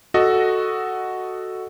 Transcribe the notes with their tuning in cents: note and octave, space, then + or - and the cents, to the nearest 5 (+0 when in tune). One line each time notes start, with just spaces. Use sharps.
F#4 +0 A4 +0 D#5 +0